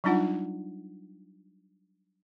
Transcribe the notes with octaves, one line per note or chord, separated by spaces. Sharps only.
F#3 G3 D4 D#4 F4 F#5